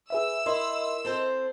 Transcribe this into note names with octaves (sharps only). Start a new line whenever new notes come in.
G#4 B4 E5 E6
E4 A#4 D#5 C6
C4 A4 C5